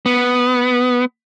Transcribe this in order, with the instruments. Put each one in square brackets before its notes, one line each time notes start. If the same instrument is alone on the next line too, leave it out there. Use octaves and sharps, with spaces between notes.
[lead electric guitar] B3